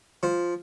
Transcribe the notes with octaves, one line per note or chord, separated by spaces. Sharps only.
F3